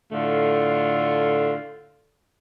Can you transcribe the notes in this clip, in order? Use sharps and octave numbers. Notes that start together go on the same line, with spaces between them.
A2 D3 A3 F4